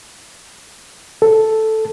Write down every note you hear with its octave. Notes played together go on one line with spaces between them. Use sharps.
A4